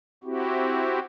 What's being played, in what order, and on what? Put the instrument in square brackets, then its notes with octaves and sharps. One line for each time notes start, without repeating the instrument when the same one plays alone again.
[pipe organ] C4 E4 F#4 G4